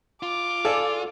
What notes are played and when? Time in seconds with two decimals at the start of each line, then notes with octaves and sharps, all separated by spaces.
0.23 F4 D6
0.65 A4 D5 F5 G#5